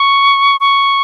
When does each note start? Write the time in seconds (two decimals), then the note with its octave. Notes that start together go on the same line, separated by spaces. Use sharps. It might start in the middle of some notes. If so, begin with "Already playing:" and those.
Already playing: C#6
0.60 C#6